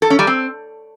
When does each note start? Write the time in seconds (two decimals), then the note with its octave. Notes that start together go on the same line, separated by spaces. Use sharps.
0.02 A4
0.10 C#4
0.19 G3
0.27 C4